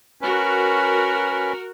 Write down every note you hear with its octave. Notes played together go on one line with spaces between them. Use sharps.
C#4 F#4 A#4 B4